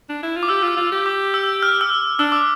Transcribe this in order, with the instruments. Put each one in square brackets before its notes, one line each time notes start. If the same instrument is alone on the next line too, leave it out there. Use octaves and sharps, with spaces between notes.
[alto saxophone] D4
E4
F4
[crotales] D6
[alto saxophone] G4 [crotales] E6
[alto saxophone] F4 [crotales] E6
[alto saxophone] F4
[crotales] E6
[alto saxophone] G4
[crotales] D6
E6
F6
E6
[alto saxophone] D4 [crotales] E6
[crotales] D6